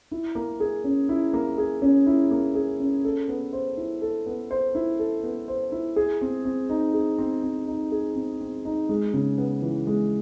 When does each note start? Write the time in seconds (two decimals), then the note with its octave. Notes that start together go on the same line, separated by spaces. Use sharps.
0.11 E4
0.35 A#3
0.60 G#4
0.84 C#4
1.09 E4
1.33 A#3
1.58 G#4
1.82 C#4
2.06 E4
2.31 A#3
2.55 G#4
2.80 C#4
3.05 A4
3.29 B3
3.53 C5
3.77 E4
4.02 A4
4.26 B3
4.51 C5
4.75 E4
4.99 A4
5.23 B3
5.48 C5
5.72 E4
5.96 G#4
6.21 C4
6.45 C4
6.69 D#4
6.94 G#4
7.18 C4
7.43 C4
7.67 D#4
7.92 G#4
8.16 C4
8.41 C4
8.65 D#4
8.89 G#3
9.14 C#3
9.38 B3
9.62 E3
9.87 G#3